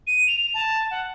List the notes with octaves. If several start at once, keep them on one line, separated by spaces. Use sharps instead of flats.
D#7
F7
A5
F#5